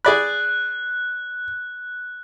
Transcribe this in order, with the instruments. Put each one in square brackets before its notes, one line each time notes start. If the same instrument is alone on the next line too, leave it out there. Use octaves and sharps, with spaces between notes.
[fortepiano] G#4 D5 B5 [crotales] F#6